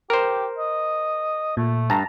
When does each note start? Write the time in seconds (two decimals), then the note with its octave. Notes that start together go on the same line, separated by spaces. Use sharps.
0.10 G4 A#4 C5
0.58 D#5
1.57 A#2 A3
1.90 G2 A5 A#5